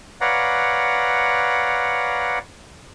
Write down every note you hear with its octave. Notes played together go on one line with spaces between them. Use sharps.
B4 C#5 D5 F5 F#5 A#5